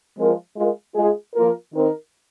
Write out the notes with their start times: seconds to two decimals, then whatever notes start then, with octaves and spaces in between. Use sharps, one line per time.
0.18 F3 G#3 C4 F4 A#4
0.56 G#3 F4 A#4
0.95 G#3 F4 G#4
1.35 F3 A#3 F4 A#4
1.74 D#3 C4 D#4 A#4